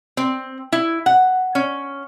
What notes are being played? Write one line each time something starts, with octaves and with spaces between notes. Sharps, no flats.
C4
E4
F#5
C#4